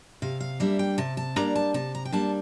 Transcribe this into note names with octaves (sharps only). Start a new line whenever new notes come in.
C3 F5
F5
G3 A#3 D4 E5
G5
C3 A5
A5
G3 A#3 D4 A#5
A5
C3 A5
A#5
G5
G3 A#3 D4 A5